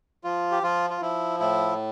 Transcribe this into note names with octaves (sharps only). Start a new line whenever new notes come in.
F3 F4
G4
F3 F4
F4
F3 E4
A2 E4